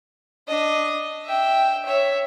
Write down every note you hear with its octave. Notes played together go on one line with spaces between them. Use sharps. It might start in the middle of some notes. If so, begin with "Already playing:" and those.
D4 D#5
E5 G5
C#5 E5